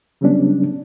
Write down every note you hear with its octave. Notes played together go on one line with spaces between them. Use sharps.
C#3 F#3 G3 B3 C#4 D4